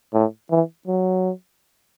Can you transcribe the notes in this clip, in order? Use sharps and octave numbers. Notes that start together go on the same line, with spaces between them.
A2
E3
F#3